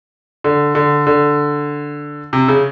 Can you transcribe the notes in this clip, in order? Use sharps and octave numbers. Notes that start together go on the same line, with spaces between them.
D3
D3
D3
C3
C#3